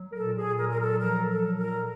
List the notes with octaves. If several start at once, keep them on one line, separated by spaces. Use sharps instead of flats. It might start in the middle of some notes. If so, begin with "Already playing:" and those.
Already playing: F#3
A#4
A#2 A4
G#4
F#3 A#4
A#4
A4
F3 A#4
A4
A#2
A#4